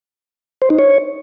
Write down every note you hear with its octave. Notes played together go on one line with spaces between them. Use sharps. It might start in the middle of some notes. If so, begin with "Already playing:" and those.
C5
D#4
C#5